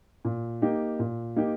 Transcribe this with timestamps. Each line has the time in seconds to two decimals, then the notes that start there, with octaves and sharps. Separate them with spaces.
0.25 A#2
0.62 A#3 D#4 G4
0.99 A#2
1.36 A#3 D#4 G4